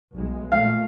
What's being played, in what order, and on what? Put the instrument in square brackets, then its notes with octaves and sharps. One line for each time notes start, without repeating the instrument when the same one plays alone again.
[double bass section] B1 G#3
[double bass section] A#2 A3 [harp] F5